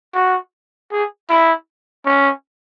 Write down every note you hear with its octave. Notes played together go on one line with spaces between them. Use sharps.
F#4
G#4
E4
C#4